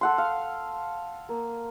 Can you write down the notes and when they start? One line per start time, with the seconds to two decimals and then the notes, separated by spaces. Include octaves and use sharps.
0.01 A4 F#5 C6
0.18 F5
1.29 A#3